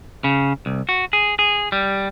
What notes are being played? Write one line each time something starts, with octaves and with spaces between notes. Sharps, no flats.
C#3
C2
F#4
G#4
G#4
G3